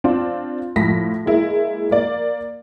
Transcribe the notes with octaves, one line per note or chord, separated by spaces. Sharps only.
C4 D4 F4
A2 F3 A#6 B6
G#3 A#3 E4
A#3 D5